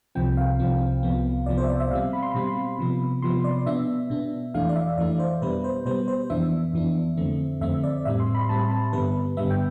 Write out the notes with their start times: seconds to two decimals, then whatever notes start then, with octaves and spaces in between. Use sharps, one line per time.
0.15 C2 C3 F3 C4 G5
0.37 F5
0.59 C2 C3 F3 C4
1.03 C2 C3 F3 B3
1.46 C2 C3 F3 B3 D5
1.58 C5
1.64 E5
1.69 D5
1.80 E5
1.91 B2 G3 C4 F5
2.13 B5
2.23 C6
2.32 B2 G3 C4 B5
2.79 C3 F3 B3
3.22 C3 F3 B3 C6
3.44 D5
3.66 B2 B3 D4 E5
4.10 B2 B3 D4
4.54 F2 E3 A3 D4 F5
4.69 D5
4.76 E5
4.98 F2 E3 A3 D4 D5
5.20 C5
5.41 B2 G3 B3 B4
5.64 C5
5.85 B2 G3 B3 C5
6.08 C5
6.30 F2 E3 B3 D4 E5
6.74 F2 E3 B3 D4
7.17 F2 D3 A3 C4
7.61 F2 D3 A3 C4 E5
7.84 D5
8.05 A2 G3 C4 E5
8.20 C6
8.35 B5
8.49 A2 G3 C4 A5
8.71 A5
8.93 G2 D3 G3 B3 B4
9.37 G2 D3 G3 B3 E5
9.50 G5